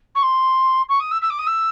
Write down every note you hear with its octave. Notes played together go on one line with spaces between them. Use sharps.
C#6
C6
C#6
D#6
E6
E6
D6
D#6
E6